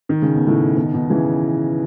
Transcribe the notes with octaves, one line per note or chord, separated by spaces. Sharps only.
D#3
C#3
B2
A2 C#3
B2 D#3
B2 D#3
C#3 E3